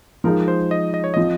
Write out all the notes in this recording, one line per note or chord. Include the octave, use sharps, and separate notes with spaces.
F3 G#3 D#4 G#4 A#4
C5
D#5
D#5
C#5
F3 C4 F4 D#5